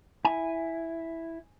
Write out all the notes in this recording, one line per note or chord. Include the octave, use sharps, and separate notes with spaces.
E4 G#5